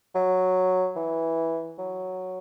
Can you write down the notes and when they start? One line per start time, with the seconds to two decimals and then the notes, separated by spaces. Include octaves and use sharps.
0.15 F#3
0.96 E3
1.79 F#3